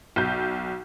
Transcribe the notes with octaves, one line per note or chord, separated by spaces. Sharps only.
B1 G6